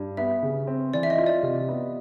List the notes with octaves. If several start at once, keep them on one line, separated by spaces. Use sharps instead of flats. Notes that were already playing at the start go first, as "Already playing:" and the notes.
Already playing: G2
B3 E5
C#3
C4
E3 D5
E5
D#5
F4
D5
C3
B3